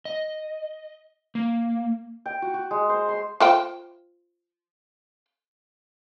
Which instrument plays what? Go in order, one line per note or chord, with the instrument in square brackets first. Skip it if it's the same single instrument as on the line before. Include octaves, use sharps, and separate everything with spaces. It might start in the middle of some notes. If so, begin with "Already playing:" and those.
[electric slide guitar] D#5
A#3
[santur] G5
F#4
F#4
G#3
C5
C6
[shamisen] F4 C5 G5